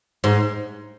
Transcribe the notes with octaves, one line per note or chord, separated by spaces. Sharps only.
G#2